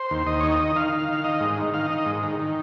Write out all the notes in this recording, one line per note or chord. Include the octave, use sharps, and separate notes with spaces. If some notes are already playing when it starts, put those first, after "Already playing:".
Already playing: C5
D#2
D#2 D#5
D#3 C#5
D#5
D#3
D#3 F5
D#3
D#3
D#3 D#5
G#2
D#3
D#3 F5
D#5
D#3
D#5
G#2
D#3
D#3